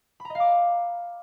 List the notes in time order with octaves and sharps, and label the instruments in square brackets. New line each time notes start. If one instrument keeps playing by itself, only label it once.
[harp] B5
A#5
D#5
F5
D6